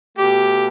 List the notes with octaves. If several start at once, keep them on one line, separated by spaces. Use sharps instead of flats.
B2 A3 G4